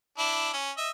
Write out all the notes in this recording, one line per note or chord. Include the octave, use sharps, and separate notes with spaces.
D4 E4
C#4
D#5 E5